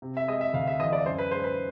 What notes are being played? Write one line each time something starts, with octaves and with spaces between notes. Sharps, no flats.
C3
E5
G#3 D#5
E5
D2 F5
E5
E3 D#5
D5
F#2 C5
B4
G#3 C5
B4